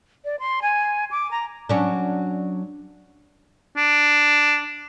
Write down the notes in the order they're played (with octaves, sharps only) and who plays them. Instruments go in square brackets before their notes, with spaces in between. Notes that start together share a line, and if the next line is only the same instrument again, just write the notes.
[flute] D5
C6
G#5
D6
A#5
[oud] F#3 C#4 D4
[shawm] D4